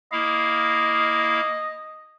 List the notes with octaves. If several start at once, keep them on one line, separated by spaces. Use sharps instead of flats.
A#3 E4 D#5 F5